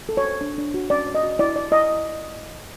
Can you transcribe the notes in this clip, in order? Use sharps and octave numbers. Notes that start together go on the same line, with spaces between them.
A4
C#5
C5
D4
D4
F#4
C#4 D5
C#5
D#5
F#4
E4 D5
E4 D5
E4 D#5